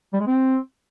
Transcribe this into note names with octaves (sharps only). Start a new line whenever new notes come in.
G3
G#3
C4